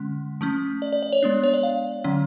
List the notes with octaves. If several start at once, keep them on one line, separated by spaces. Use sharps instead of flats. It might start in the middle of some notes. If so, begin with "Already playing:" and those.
Already playing: D3 G#3 C#4
F3 A3 C#4
D5
D5
D5
C#5
G#3 B3 D4
C#5
D5
F5
D3 F#3 C#4